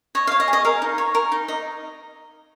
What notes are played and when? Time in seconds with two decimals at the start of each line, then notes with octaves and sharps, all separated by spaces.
0.15 C#5 D#5
0.27 C#5 F5
0.40 D#5
0.48 G#4
0.53 D#5
0.65 A#4 F5
0.82 D#4
0.98 C#5
1.15 A#4
1.32 D#4
1.48 D#5